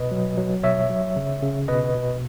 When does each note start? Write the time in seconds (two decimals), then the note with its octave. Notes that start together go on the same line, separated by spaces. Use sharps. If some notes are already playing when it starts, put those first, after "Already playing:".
Already playing: B2 B4 D#5
0.11 F#3
0.37 F#3
0.63 B2 C#5 E5
0.90 F#3
1.16 C#3
1.42 C#3
1.68 B2 B4 D#5
1.95 B2